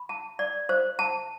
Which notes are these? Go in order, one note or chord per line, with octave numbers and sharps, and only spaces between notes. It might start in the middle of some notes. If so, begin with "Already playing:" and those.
Already playing: B5
A5
D5
C5
A5